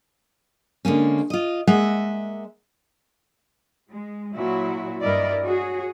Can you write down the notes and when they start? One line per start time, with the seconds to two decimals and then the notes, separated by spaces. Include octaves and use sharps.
0.85 D3 G#3 A#3 C#4
1.30 F4 D#5
1.67 G#3 A#3 D#5 E5 F#5
3.90 G#3
4.34 A#2 F#3 E4 F#4
5.01 G2 G3 E4 A#4 D5 D#5
5.43 F#4 G#4 C#5